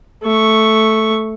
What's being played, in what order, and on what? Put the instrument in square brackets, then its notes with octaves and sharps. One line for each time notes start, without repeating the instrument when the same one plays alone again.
[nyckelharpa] A3 C#6